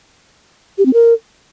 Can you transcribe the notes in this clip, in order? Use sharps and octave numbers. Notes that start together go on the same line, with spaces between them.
G4
C4
A#4